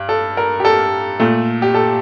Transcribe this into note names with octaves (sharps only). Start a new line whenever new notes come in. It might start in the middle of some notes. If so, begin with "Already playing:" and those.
Already playing: G2
A4
A#4
G4
A4
A#2 A3
G4
A4